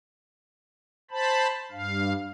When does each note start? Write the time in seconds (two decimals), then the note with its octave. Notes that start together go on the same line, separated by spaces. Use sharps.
1.11 C5 A5 B5
1.72 G2 F5